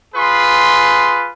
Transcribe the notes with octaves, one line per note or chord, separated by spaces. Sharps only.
F4 G#4 B4 C6